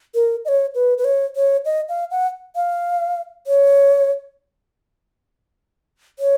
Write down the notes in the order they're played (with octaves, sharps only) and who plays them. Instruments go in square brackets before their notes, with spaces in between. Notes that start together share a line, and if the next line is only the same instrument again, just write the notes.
[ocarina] A#4
D#5
C#5
B4
B4
C#5
C#5
D#5
F5
F#5
F5
C#5
C#5